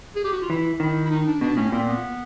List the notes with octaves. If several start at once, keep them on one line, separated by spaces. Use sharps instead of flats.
G#4
G4
F#4
F4
E3 E4
D#3 E4
E4
D#4
D4
B2 D4
A2 C#4
A#2 C4
B3